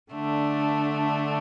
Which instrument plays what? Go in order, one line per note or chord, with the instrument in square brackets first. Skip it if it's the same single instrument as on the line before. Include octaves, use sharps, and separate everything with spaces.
[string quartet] D3 A3 D4